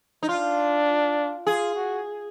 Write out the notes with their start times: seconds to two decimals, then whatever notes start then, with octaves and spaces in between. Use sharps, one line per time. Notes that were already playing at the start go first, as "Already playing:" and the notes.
0.23 D#4
0.29 D4 F4
1.46 F4 G#4
1.75 F#4